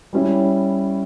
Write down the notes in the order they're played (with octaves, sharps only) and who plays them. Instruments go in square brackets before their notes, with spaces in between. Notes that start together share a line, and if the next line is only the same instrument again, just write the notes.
[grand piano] G3 C#4 E4